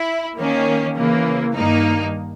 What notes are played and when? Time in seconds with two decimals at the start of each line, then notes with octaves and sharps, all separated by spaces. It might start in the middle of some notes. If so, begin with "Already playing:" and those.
Already playing: E4
0.37 D#3 A#3 C#4
0.96 C#3 E3 A#3
1.55 G2 D#3 A#3 D#4